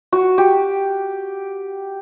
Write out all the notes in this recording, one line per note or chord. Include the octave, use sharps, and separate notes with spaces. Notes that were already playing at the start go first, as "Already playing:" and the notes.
F#4
G4